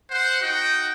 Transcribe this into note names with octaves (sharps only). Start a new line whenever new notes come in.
C5 F#5
D#4 F#4 D#5 F#5 G5